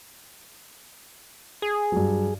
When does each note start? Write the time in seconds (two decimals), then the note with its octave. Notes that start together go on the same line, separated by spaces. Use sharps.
1.62 G#4
1.92 G2 F#3